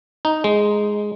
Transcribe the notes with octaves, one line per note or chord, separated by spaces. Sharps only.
D#4
G#3